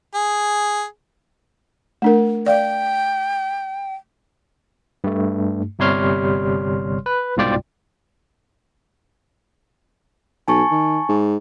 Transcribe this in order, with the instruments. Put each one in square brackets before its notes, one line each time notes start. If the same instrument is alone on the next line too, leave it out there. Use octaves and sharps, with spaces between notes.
[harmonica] G#4
[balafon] A3 D4 A#4
[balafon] D5 F5 [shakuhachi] G5
[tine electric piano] G2 A3
G1 C3 G3 C#5 C6 F6
B4
C2 G#2 B2 F4 D5 G5
[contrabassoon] B1 [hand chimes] G#5 A5 C#6
[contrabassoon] D#3
G#2